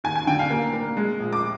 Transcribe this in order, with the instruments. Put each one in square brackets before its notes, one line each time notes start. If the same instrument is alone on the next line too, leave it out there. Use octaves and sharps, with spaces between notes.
[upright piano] D#2 G#5
G#5
D3 G5
F5
A#3
A#3
G#3
A#1
D6